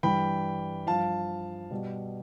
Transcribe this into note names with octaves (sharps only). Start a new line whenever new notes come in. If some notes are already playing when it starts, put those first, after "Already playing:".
G2 E3 G3 G5 B5
G2 F3 F5 A5
B2 G3